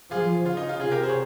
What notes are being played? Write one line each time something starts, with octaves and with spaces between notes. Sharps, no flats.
F3 F4 G#4
C#3 F4
D#4
F4
C3 F4 G#4
G4 A#4
G#4 C5
C#5